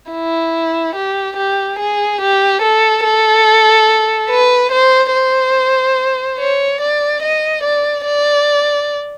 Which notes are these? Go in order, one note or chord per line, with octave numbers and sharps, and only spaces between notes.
E4
G4
G4
G#4
G4
A4
A4
B4
C5
C5
C#5
D5
D#5
D5
D5